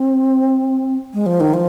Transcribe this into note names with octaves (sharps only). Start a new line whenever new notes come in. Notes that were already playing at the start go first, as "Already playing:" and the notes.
Already playing: C4
G#3
F3
D#3
F3